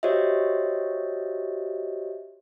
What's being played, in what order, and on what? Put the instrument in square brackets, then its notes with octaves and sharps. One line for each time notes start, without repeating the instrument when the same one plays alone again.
[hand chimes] F#4 G4 C5 C#5 D#5 E5